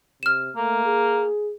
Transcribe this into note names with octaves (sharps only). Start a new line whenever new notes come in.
C3 F6 E7
A3 A#3
G#4